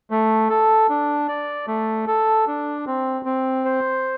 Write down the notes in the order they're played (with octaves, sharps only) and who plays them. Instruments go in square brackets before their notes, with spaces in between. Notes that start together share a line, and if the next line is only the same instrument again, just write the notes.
[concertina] A3
A4
D4
D5
A3
A4
D4
C4
C4
C5